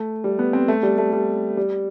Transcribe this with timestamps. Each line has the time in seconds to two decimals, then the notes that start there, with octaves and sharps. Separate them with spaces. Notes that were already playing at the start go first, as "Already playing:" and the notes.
Already playing: A3
0.24 G3
0.39 B3
0.53 C4
0.68 A3
0.83 G3
0.98 A3
1.12 G3
1.57 G3